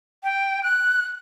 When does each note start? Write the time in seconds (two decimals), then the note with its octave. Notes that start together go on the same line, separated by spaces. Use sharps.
0.24 G5
0.63 F#6